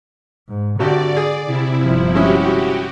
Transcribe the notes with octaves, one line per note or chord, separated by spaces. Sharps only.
G#2
G#1 D3 F#4 G4 D5
G#4
C3 E4
G1 F3
G#3 C#4 E4 F#4 G4